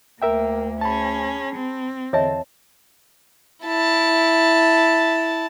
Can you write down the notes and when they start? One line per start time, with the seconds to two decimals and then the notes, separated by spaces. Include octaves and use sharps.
0.22 D2 A#3 A#4 E5 G5
0.81 C#4 G#4 A5 B5
1.56 C4
2.13 E2 D3 C#5 D#5 E5 A5
3.64 E4 A5